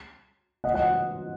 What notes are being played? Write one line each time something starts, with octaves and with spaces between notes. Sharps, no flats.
D#5 F#5
D#5 F#5